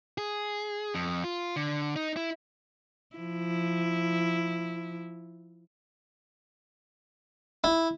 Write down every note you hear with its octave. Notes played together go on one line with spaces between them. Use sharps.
G#4
F2
F4
D3
D#4
E4
F3 E4
E4